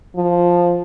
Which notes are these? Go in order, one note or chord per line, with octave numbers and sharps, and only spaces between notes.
F3